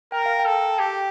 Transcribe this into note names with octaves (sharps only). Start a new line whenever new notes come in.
A#4 G5
F5
G5
A4
G4